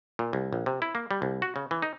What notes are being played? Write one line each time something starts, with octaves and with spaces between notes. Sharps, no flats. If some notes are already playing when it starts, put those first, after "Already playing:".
A#2
C2
A#1
C3
E4
A#3
G3
C2
F#4
C#3
E3
D#4